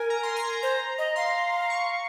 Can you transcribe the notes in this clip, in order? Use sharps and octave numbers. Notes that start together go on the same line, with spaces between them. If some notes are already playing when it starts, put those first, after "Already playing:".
Already playing: A#4 G#5
A#5
C6
A#5
C5
D#5
F5 C6
C#6